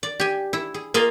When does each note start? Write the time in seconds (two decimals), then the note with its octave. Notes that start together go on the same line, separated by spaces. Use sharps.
0.03 D5
0.20 G4 G#5
0.53 E4
0.74 G#4
0.94 A#3 F4 G#4 A#4 D#5 F5